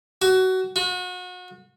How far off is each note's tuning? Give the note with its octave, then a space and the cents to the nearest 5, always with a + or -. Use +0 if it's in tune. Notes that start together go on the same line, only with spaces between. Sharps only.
F#4 +20
F#4 -35